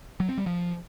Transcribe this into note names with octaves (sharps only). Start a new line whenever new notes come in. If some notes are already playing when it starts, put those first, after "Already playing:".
F#3
C4
G3
F3